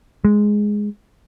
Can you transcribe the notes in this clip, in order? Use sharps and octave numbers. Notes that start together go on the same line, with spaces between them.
G#3